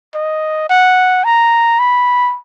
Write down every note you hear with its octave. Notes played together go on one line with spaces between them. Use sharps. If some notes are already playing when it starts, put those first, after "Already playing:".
D#5
F#5
A#5
B5